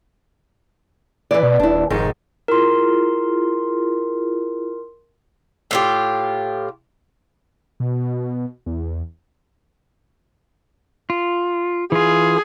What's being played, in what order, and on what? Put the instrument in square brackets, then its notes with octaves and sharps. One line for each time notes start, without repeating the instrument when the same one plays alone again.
[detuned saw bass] E3 [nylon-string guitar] B4 D5
[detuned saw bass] B2
[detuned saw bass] D#1 [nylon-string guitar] D4 E4
[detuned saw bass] F1 [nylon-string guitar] G#2 D#3 G#3
[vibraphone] E4 F4 G#4 [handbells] A#4 C6
[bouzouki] A2 F4 G4
[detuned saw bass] B2
E2
[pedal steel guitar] F4
[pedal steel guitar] E3 F4 [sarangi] G#4